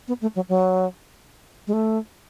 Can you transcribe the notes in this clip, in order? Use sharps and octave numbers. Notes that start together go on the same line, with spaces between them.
B3
A3
F#3
F#3
G#3
A3